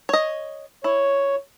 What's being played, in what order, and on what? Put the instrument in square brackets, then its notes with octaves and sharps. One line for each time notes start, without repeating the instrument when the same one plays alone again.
[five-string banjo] C#5 D#5
[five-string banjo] E4 [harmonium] C#5